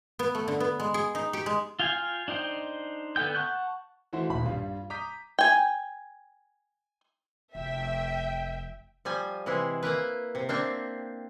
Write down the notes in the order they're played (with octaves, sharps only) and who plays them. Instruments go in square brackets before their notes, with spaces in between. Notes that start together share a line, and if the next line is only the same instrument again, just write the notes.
[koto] B3
A3
D3
B3
G#3
G#4
D#4
G4
G#3
[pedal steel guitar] F4 F5 G5 G#5
D4 D#4 C5 G5
D3 B3 A4 G5 G6
F#5 A5 C#6 F#6 G6
[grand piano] E3 A3 E4 F#4 C5
D#1 B1 B5
G2 G3 F4
A#5 D6 D#6 G6 B6
[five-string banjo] G5 G#5
[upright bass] F1 [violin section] E5 G5
[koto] F3 G3 G#5
C3 E3 G#3 E4
A#3 E4 A#4 B4
C3
A#3 C4 D4 E5 G5